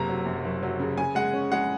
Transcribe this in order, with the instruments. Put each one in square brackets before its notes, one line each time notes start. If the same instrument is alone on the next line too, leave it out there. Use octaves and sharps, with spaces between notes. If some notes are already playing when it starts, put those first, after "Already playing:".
Already playing: [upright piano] F#1 C3 A#5
F#3
F#2
F#1
F#3
C#3
C#3 G#5
G#3 F#5
C#4
G#3 F#5